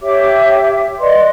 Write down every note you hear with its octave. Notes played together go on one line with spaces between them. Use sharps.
G4 C#5 E5 D6
B4 D5 D#5 C6